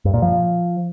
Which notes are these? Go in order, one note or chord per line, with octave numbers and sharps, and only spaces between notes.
G2
A#2
F3